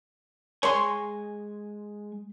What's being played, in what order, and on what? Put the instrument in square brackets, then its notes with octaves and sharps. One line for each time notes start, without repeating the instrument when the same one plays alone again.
[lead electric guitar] G#3 G#5 [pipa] C#5 C6